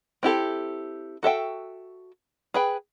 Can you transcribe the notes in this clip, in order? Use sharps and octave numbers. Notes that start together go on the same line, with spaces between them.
C4 E4 G4 A4
F#4 A4 E5 G5
G#4 B4 G5